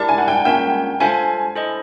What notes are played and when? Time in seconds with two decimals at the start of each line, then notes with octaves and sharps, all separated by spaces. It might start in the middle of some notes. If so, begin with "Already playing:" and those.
Already playing: E4 G4 A#4 D5 A5
0.09 G#5
0.18 F#5
0.28 G5
0.45 A#3 C#4 F4 A#4 C#5 G5
1.00 F4 A4 C5 F5 G#5 A5
1.55 E4 A4 C5 D#5